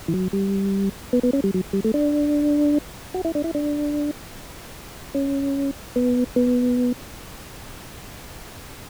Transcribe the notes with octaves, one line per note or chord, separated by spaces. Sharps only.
E3
F#3
G3
B3
B3
C#4
G3
F#3
G3
A3
D4
F#4
E4
D4
E4
D4
C#4
B3
B3